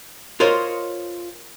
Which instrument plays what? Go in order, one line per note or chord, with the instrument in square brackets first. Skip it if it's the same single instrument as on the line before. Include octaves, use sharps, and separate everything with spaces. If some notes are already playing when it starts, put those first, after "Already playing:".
[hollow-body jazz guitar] F4 A#4 C5 C#5 D#5